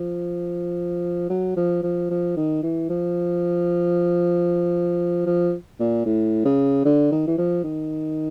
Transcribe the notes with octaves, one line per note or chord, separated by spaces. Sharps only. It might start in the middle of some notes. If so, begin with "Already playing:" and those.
Already playing: F3
F#3
F3
F3
F3
D#3
E3
F3
F3
A#2
A2
C#3
D3
D#3
E3
F3
D#3